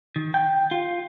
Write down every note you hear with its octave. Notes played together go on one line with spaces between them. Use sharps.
D#3
G5
F4